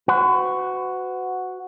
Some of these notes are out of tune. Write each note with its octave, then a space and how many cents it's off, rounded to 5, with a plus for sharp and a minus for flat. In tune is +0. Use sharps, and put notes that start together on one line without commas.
F#4 +0 B4 +45